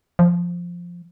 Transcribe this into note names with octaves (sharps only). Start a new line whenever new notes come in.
F3